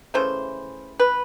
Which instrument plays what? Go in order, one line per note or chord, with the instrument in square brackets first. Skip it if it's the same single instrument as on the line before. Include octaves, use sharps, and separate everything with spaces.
[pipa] C#3 E3 A3 C5
B4